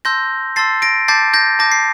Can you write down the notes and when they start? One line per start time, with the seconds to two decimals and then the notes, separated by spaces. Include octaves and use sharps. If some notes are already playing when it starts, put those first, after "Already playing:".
0.05 A5 C6 E6 G6 A#6
0.56 A5 C6 E6 A6 C7
0.82 A#6 D7
1.08 A5 D6 G6 A6 C7
1.34 G6 A#6
1.59 A5 D6 G6 A#6
1.72 C7